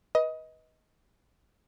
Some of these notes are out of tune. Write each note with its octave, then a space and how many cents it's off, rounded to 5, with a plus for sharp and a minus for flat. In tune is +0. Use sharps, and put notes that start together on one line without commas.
B4 -15 D#5 +20